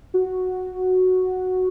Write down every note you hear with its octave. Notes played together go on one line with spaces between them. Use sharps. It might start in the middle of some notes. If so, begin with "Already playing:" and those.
F#4